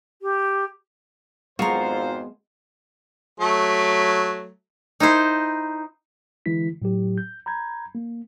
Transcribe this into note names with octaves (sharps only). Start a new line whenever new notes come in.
G4
G#1 F2 G#3 B3 F4 C5 A#5 C#6
F#3 A3
D#4 E4 C5
D3 E3 G#3 E4 B6
A2 F#3 G4
G6
A#5 B5 G6 G#6
A#3